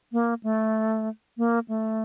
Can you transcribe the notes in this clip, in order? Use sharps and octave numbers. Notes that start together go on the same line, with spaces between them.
A#3
A3
A#3
A3